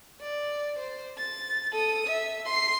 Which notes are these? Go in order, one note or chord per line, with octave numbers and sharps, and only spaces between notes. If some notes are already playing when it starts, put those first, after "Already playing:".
D5
C5
A6
A4 D#6
E5
C6 C7